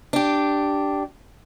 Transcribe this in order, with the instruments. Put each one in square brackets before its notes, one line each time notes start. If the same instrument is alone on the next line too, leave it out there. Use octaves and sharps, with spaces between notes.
[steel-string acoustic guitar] D4 G4